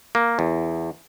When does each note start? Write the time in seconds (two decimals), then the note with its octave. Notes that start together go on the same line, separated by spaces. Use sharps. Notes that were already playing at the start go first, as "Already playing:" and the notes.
0.15 A#3
0.39 E2